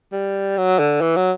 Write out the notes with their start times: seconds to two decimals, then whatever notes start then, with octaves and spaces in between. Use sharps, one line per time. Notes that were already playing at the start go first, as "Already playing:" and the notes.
0.12 G3
0.57 F#3
0.79 D3
1.01 E3
1.16 F#3